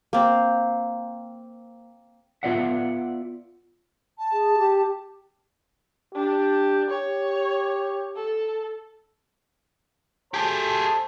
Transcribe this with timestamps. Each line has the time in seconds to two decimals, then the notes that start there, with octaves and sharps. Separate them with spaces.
0.13 A#3 C4
2.43 B3 F4 B4 D5 E5 F#5
4.18 A5
4.32 G#4
4.58 G4
6.15 D4 G4
6.90 G4 C#5
8.16 A4
10.34 A3 G4 G#4 C5 A5